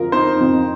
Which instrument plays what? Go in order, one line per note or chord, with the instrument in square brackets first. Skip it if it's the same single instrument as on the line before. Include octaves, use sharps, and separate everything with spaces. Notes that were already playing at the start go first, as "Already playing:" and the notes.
Already playing: [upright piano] F2 F3 [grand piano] A#4
[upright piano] D#4 [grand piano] C5
[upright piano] F2